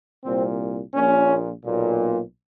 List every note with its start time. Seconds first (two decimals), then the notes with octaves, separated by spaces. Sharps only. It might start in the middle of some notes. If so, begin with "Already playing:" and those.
0.24 C2 A#2 C4
0.94 A#1 A#2 C#4
1.65 B1 A#2